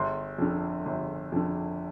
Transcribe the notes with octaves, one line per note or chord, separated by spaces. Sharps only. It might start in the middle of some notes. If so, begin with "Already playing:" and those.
Already playing: G1 C6
F2 D3
G1
F2 D3